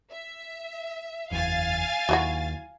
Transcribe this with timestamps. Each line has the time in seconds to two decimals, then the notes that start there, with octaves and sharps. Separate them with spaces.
0.12 E5
1.31 F#1 E2 F5 G#5 A6
2.09 D#2 F#3 E4 F#4